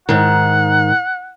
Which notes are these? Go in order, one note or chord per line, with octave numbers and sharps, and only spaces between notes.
G#2 D#3 F#5